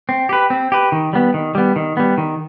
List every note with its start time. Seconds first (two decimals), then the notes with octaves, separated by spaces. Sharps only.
0.09 C4
0.29 G4 B4
0.50 C4
0.72 G4 B4
0.92 D#3
1.13 G3 B3
1.34 D#3
1.55 G3 B3
1.76 D#3
1.97 G3 B3
2.18 D#3